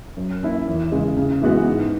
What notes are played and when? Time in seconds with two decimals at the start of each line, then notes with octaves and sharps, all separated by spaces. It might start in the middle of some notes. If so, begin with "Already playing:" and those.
0.17 F#2
0.43 D#3 A#3 C#4 E4
0.68 E2
0.92 C#3 G#3
1.17 C#3
1.41 E3 G#3 B3 F#4
1.67 G#2